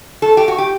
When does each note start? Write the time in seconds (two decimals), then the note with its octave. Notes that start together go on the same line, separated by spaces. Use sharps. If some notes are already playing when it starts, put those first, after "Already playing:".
0.22 A4
0.37 G4
0.48 F#4
0.58 G4